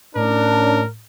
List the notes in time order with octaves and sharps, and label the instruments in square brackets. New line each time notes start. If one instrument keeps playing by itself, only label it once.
[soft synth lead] A2 [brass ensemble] C#4 D4 [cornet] A#4